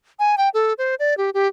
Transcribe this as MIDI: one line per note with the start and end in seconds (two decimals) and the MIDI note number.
0.19 0.35 80
0.38 0.49 79
0.54 0.73 69
0.78 0.95 72
0.99 1.17 74
1.17 1.30 67
1.34 1.48 67